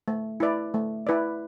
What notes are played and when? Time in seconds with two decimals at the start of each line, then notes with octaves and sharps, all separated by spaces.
0.08 A3
0.40 E4 B4 D5
0.74 A3
1.07 E4 B4 D5